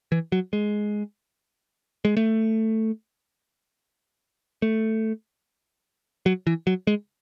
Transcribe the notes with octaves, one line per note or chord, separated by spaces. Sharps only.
E3
F#3
G#3
G#3
A3
A3
F#3
E3
F#3
G#3